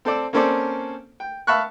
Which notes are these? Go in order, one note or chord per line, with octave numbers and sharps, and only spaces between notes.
C4 A4 C5 D5
A#3 C4 C#4 A4 C5 D5
G5
E5 F5 A5 B5 C#6 F#6